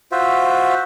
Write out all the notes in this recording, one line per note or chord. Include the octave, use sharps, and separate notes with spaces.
F4 F#4 C5 E5